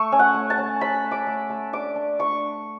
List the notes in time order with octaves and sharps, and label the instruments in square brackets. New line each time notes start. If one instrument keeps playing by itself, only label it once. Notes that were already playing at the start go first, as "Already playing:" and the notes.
Already playing: [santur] A3 C#6
C#4
F#5
A3
A5
C#4
C#4 B5
A3
D6
A3
A3
D4 D6
D4
D4 C#6